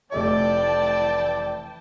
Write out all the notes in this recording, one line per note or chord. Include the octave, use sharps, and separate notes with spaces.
F1 E3 A3 D5 D#5 G5 A5